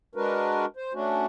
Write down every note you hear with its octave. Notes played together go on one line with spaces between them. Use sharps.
G#3 D4 F#4 A#4 B4
C5
A3 C#4 D4 F#4